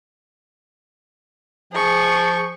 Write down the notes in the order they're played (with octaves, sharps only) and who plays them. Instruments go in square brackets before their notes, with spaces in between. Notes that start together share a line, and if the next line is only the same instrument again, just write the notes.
[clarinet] F3 [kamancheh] G#4 C#6